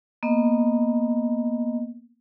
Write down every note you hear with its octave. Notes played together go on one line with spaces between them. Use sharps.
A#3 B3 D#5